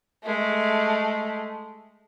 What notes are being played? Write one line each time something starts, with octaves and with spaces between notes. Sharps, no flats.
G#3 A3